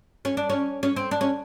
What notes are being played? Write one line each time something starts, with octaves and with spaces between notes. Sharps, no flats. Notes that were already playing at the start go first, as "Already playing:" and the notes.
C#4
D4
C#4
C#4
C4
D4
C#4